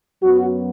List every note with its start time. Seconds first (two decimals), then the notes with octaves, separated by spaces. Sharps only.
0.22 F#2 F#3 B3 F#4